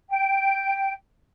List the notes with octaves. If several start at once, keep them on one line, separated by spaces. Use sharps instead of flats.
G5